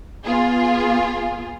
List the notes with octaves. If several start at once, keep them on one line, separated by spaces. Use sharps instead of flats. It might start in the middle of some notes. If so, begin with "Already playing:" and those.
B3 F4 G#4